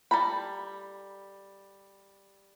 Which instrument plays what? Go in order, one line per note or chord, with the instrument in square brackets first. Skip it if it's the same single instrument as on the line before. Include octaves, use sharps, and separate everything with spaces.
[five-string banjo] G3 A4 A#5 B5